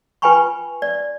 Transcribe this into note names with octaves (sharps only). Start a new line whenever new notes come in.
F4 B4 G5 G#5 B5 C#6
D5